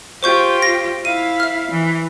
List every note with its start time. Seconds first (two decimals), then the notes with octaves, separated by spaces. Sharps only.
0.23 F4 G4 C5 C#6 G6
0.62 A#6
1.05 E4 F5 D#7
1.40 E5 F6
1.71 E3